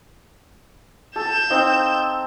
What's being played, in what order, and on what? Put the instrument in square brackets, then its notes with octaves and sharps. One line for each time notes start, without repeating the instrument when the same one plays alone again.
[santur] A4 [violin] G6 E7
[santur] C4 D#4 F5